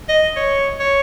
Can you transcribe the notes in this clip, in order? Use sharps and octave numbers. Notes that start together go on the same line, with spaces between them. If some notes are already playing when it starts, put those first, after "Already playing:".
D#5
C#5
C#5